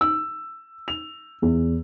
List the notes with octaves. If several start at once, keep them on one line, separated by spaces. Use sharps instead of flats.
E6
F7
E2